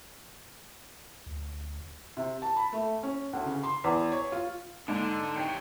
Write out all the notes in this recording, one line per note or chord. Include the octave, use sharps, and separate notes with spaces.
D2
C3
A5
B5
A3
C#4
D2
C#3
C6
E2
C#5
F4
G#2 D3 D4
C3 C#5 G5